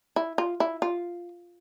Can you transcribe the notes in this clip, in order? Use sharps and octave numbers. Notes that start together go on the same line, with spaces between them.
E4
F4
E4
F4